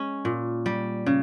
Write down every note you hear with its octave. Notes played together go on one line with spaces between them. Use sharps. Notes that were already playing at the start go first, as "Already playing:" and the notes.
Already playing: G#3 C#4
A#2
G3
C#3